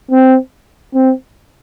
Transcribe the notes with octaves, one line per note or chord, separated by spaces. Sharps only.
C4
C4